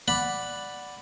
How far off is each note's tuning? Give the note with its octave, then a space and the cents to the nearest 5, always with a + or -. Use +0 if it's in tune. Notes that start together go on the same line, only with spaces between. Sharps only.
D5 +0 F#5 +0 B5 +0